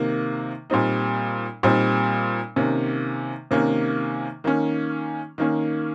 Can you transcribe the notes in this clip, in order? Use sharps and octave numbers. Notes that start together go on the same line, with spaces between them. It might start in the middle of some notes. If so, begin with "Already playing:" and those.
Already playing: C3 D#3 A#3
A#2 G3 C4 D#4
A#2 G3 C4 D#4
C3 D#3 A#3 C#4
C3 D#3 A#3 C#4
D#3 A#3 C#4
D#3 A#3 C#4